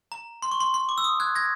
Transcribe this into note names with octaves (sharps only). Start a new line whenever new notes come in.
A#5
C6
C#6
C6
C6
D6
E6
D#6
F#6 G#6
G#6 A#6